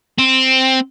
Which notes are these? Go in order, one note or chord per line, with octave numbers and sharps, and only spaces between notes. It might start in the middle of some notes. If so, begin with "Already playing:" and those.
C4